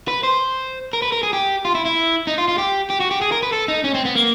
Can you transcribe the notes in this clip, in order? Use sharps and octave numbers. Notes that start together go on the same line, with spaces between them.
B4
C5
A#4
B4
A#4
G#4
G4
F4
E4
E4
D#4
F4
F4
G4
G4
F#4
G4
G#4
A#4
B4
A4
D#4
C#4
C4
B3
A#3